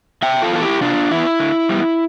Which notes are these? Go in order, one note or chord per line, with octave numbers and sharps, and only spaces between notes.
C3 E5 G5
F4 A4
E3 B3 A4
E4 G4
C3 D4 F4
E3 B3 E4
D3
G3 B3